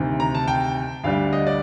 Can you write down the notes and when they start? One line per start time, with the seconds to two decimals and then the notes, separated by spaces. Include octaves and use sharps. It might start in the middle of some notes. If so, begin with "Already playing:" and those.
Already playing: D2 C3 D#3
0.20 A#5
0.35 A5
0.48 G5
1.04 D2 D3 G3 F5
1.33 D#5
1.47 D5